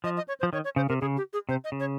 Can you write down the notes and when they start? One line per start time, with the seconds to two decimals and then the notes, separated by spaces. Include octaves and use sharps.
0.04 F3 D#5
0.17 D#5
0.28 C#5
0.40 C5
0.43 F3
0.53 D#3 C#5
0.64 C#5
0.76 C#3 C5
0.88 C3 A#4
1.01 C#3 G#4
1.17 G4
1.33 G#4
1.49 C3 C5
1.64 D#5
1.72 C#3
1.80 C#5